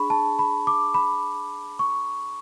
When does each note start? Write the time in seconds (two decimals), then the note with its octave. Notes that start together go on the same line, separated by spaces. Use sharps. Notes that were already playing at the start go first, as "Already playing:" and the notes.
Already playing: D4 G#4 B5 C#6
0.10 A5
0.39 B5
0.67 D6
0.94 B5
1.79 C#6